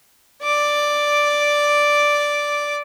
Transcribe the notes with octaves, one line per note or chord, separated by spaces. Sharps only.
D5 D6